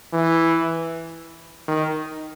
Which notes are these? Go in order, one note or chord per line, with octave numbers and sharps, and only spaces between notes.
E3
D#3